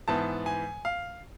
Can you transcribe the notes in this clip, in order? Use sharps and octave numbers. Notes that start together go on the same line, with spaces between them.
G#2 E3 B3 A5
G#5
F5